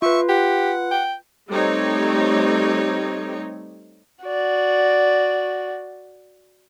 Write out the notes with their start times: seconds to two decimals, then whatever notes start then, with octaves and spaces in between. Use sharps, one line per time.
0.02 F4 B4 E5 C#6
0.29 G4 F#5
0.91 G5
1.49 G3 A3 C4 D#4 C#5
4.24 F#4 D5